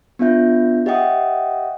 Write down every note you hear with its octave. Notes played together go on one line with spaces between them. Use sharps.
B3 D4 F4 E5 G6
G4 D#5 E5 F#5 G5 D#6